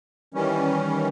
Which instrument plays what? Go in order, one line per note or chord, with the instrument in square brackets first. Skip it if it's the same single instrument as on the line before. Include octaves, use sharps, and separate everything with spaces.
[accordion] D#3 E3 G3 C#4